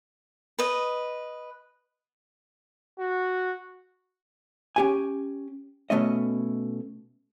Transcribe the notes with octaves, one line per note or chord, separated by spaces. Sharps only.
B4 D#5
F#4
C#4 G4 G#5
B2 A3 C#4 D#5